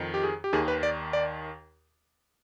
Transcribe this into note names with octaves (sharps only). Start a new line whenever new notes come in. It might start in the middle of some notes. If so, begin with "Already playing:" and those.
Already playing: F2 D#3
G4
G#4
G4
D#2 D#3 G#4
B4
D5
D5